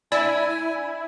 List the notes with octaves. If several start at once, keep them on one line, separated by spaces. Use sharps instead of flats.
D4 E4 D5 G#5 E6